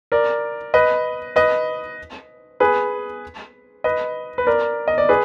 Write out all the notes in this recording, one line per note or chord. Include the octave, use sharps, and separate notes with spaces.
A#4 D5
B4 D#5
B4 D#5
G#4 B4
B4 D#5
B4
A#4 D5
D#5
D5
G#4 B4